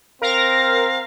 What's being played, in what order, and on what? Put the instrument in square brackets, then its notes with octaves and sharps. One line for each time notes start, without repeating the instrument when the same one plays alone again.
[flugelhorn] C4 [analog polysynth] A#4 A#6 [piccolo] F5